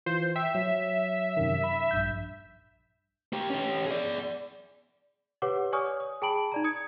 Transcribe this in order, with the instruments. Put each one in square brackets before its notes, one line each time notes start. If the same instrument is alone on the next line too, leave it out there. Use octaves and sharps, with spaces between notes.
[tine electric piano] E3 F4 [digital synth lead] C5
[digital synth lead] E5 [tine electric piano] G5
[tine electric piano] F#3
F#2 C3 D#3
B5
A#1 G2 G6
[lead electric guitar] A#3 G4
C#4 G4
G#4 D5
[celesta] G4 B4 C#5 F#5 D6
C#5 D5 G#5 C#6 D#6 F6
D#6
G#4 G5 A5 B5 D7 F#7
D#4 D5 A#5
D#6 G#6 C#7